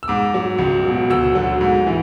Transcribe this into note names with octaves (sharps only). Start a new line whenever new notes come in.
E6
G#2 D6
F#3
C#2
B2 F#3
D2 E6
D3 F#3
G#2
E3